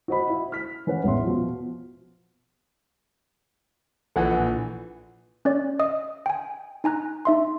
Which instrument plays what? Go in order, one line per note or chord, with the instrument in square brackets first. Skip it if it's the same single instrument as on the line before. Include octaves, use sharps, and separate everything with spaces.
[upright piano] F#4 C5 D#5 B5
E4
F6 B6
E3 C#4 B4 F#5
A1 E2 E5 C6
B2 F3
[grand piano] A#1 E3 [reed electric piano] A4 F#5 G#5
[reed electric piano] A#2
[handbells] C#4 C#5 D5
D#5 D#6
G5 G#5
D#4 G#5 A#5 F#6
D#4 E5 C6